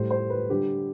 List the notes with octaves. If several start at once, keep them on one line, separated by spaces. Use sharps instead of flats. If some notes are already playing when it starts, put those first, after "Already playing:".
Already playing: A2 G3 C5
C5
B4
D3 G3 G4